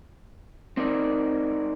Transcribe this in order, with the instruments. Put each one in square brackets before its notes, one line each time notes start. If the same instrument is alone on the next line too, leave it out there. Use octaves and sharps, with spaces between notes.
[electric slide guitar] C4 D#4 A#4 D5